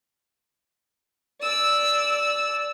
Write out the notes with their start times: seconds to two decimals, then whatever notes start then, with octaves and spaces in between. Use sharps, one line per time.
1.41 D5 E6